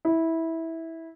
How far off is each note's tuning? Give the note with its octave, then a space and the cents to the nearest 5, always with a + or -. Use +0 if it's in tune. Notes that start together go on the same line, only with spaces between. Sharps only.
E4 -15